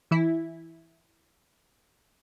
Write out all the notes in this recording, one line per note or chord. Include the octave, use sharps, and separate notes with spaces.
E3 E4